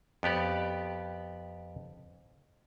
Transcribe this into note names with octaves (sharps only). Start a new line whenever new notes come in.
F2 B3 G4 D5